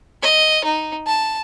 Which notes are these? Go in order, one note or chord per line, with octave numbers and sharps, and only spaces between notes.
D#5
D#4
A5